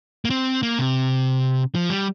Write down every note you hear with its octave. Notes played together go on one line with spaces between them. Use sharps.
A#3
C4
A#3
C3
F3
G3